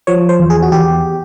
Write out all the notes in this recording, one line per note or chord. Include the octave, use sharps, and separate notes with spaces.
F3 C#5
C5
E2
G#4
F#4
E2 G4